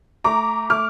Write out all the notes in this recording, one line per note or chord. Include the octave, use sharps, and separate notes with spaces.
A3 A#5 D6
A3 D6 F6